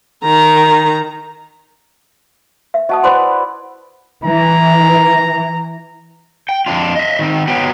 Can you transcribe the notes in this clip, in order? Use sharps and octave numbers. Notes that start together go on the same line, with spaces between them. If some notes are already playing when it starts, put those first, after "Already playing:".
D#3 A#5
E5
F#4 D#5 A5 D#6
E4 B4 C5 D5 C6
E3 A#5
G5
F2 D4 F4
D#5 E5
D#3 C4
F#3 B3 G4